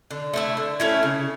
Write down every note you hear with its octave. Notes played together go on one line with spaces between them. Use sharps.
D3
A3 C#4 E4
D3
A3 C#4 E4
C#3